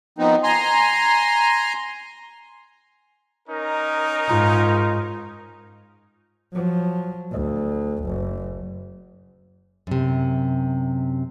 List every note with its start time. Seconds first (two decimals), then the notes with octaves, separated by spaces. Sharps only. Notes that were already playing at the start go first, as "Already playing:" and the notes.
0.19 D#3 F3 B3 C4 D#4
0.43 G#5 A#5 C6
3.49 C#4 D#4 A#4
4.29 G#2 F4 A#5
6.53 F3 F#3
7.31 D2
8.05 F#1
9.87 F#2 C3